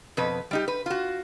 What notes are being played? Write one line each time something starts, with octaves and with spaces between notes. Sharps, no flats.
F2 B2 B4
G3 D#4 G4
B4
F4 F#4